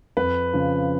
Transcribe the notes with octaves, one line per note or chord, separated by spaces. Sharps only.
F2 B4
C#3 F3